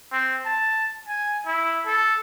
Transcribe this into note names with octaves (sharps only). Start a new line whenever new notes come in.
C4
A5
G#5
E4
A4